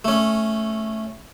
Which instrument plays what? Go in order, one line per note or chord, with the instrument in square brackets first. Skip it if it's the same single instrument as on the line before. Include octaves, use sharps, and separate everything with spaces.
[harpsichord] A3 C#4